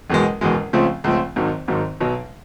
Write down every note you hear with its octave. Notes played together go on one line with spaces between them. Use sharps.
F#1 E2 B2 G#3
F#1 E2 B2 G#3
C#2 C#3 F3 A3 C4
C#2 C#3 F3 A3 C4
G#1 G#2 D#3 F#3
G#1 G#2 D#3 F#3
B1 B2 F#3 B3